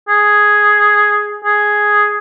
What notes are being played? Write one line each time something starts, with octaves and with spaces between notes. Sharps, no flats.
G#4
G#4